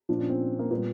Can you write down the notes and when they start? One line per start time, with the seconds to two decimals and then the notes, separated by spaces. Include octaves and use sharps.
0.09 A#2 F3 D4
0.19 C#4
0.29 C4
0.59 A#3
0.70 A#2 G3 B3